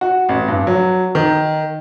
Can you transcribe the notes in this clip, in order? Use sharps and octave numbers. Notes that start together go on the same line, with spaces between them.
F#4
A1
G2
F#3
D#3